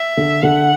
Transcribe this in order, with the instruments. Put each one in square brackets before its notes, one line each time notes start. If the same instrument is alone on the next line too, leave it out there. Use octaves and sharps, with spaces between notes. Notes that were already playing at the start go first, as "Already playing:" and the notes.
Already playing: [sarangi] E5
[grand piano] D3
[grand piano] D3 [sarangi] F#5